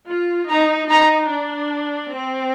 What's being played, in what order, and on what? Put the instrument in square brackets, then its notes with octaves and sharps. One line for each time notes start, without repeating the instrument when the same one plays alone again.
[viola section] F4
[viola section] D#4 [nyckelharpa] A#5
[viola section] D#4 [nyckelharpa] A#5
[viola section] D4
C4